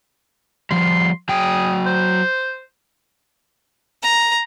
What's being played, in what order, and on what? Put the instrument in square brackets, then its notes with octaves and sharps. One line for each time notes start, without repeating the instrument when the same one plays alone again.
[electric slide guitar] F3 G3 [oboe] C6
[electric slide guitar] F#3 G5 [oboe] G#4
[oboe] C5
[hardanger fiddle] A#5